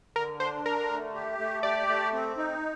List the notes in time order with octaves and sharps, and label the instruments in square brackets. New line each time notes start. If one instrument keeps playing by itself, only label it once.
[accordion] D3 [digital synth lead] A#4
[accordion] D4 [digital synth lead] C5
[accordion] D3 [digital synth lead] A#4
[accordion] A3
G4
A3
[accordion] G4 [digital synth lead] D5
[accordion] A3
C4
D#4